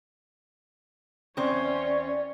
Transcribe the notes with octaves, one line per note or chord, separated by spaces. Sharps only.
E2 C4 C#4 C#5 D5